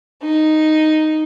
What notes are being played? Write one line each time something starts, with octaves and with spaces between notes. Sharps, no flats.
D#4